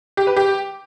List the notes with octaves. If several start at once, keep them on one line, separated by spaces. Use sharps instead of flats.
G4
B4
G4